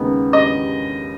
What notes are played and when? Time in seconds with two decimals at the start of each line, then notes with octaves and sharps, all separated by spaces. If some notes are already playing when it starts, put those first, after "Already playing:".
Already playing: D#2 C#3 G#3 B3 D#4
0.33 D#5